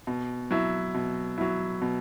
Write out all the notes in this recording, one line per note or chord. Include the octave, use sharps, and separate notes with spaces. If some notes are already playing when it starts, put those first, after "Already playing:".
B2
F#3 E4
B2
F#3 E4
B2